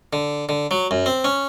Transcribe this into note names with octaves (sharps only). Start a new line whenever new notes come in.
D3
D3
F#3
F#2
C4
C#4